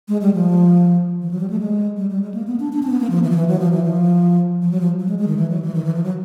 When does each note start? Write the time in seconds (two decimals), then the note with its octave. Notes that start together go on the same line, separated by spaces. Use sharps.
0.08 G#3
0.21 G3
0.33 F3
1.22 E3
1.31 F#3
1.40 G3
1.50 A3
1.60 G#3
1.97 G3
2.10 G3
2.23 G#3
2.34 A#3
2.47 B3
2.60 D4
2.73 D4
2.83 C#4
2.87 C4
2.91 B3
3.00 A#3
3.10 F3
3.23 E3
3.30 F3
3.36 E3
3.48 F#3
3.60 F3
3.72 E3
3.83 F3
4.62 F3
4.71 F#3
4.81 F3
4.99 F#3
5.09 G#3
5.19 G#3
5.27 D#3
5.37 E3
5.50 F#3
5.62 E3
5.75 D#3
5.84 E3
5.94 F3
6.04 F#3